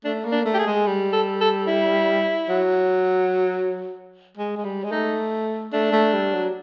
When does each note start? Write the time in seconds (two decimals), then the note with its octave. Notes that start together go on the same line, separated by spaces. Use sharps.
0.05 A3 D4
0.25 A#3
0.32 D4
0.45 A3
0.54 G4
0.59 G#4
0.67 G#3
0.86 G3
1.13 A4
1.41 A4
1.67 E4
2.49 F#3
4.37 G#3
4.57 G#3
4.65 G3
4.84 G#3
4.91 A3 D#4
5.73 A3 D4
5.92 A3
6.14 G3
6.33 F#3